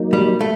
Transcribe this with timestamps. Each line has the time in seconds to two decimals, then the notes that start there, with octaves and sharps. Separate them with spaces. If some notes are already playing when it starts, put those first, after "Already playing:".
Already playing: F#3 A#3 D#4
0.13 G3
0.41 A3